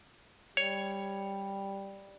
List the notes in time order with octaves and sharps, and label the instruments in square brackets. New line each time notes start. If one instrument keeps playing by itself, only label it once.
[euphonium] G3 [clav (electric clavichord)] C#5